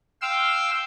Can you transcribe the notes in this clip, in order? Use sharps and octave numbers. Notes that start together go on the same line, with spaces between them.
F5 G5 C6 E6